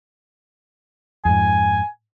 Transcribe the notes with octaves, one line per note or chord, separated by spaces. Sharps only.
F2 G#2 G#5